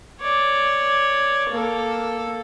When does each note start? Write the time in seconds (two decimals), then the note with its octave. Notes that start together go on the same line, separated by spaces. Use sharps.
0.21 C#5 D5
1.50 A#3 A4